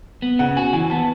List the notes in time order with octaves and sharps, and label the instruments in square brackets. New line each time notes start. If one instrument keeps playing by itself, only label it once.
[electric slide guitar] B3
[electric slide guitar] C#3 [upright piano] F#5
[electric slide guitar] F#4 [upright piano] G#5
[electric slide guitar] E3 [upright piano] G#5
[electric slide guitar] B3 [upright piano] A5